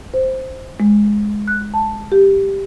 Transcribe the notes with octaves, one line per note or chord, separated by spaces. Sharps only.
C5
G#3
F#6
A5
G4